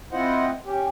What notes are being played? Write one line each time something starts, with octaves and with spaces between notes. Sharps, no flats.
C4 E4 F4 C5 D#5 F#5
C#4 G4